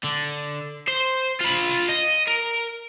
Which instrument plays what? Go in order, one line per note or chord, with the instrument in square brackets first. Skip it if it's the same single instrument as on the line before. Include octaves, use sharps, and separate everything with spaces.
[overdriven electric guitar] D3
C5
F4 B5
D#5
A#4